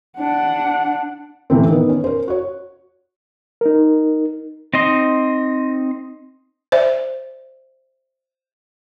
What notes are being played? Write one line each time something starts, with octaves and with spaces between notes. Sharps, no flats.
D4 F#5
A2 C3 E3 C4
D#3 B3
C#4
A#4 C5
F#4 C#5
D#4 A#4
C4 D#4 D#5 C6
C5 D5 E5